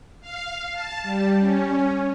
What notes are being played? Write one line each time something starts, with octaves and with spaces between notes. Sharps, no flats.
F5
A5
G3
C#4